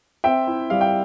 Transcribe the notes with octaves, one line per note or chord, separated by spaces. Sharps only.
C4 E5 G5
E4
G3 F5
G5